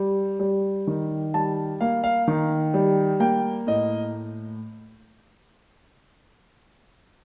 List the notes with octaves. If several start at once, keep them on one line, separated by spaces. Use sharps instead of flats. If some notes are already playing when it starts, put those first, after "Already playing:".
Already playing: G3
G3
D#3
G3 A5
A#3 F5
F5
D#3
G3
A#3 G5
A2 D#5